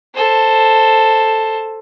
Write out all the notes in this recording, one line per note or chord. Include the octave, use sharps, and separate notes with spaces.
A4 C5